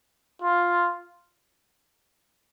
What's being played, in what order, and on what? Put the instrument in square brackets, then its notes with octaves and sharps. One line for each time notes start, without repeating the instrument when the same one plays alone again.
[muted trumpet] F4